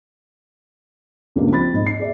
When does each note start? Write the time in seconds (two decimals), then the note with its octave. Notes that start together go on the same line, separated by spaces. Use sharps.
1.36 C#2 G2 A#3 D4
1.50 F3 C4 B5 A6
1.74 G#2 D#5
1.86 C7
1.99 G#4 D5 E5